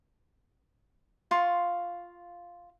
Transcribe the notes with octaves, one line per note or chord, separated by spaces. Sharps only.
F4 F5 C6 C#6